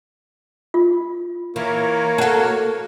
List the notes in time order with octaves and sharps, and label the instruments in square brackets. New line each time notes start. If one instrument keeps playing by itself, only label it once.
[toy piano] F4
[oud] E3 [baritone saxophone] A#3 [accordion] A#4 C#5
[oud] F#4 A4 [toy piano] F#5 A5